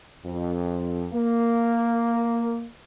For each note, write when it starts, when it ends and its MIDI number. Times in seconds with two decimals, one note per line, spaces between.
0.25 1.07 41
1.13 2.67 58